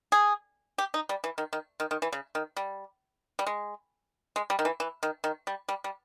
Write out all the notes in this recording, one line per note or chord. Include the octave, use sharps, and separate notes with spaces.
G#4
G4
D#4
G3
E3
D#3
D#3
D#3
D#3
E3
C#3
D#3
G3
G3
G#3
G#3
G3
D#3
E3
E3
D#3
D#3
G3
G3
G3